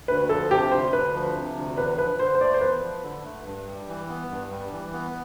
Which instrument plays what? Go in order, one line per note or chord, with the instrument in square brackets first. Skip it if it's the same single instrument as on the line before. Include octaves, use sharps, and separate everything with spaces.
[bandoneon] D2 [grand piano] B4
[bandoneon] F3 [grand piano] A4
[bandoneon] C3 [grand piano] G4
[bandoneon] D2 [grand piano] C5
[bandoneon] D2 [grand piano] B4
[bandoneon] F3
C3
D2
[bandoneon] E2 [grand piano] B4
[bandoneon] F3 [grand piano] B4
[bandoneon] D3 [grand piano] C5
[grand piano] C5
[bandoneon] A3 [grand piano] D5
[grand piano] C5
[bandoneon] E2 [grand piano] B4
[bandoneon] F3
D3
A3
G2
G3
E3
B3
G2
G3
E3
B3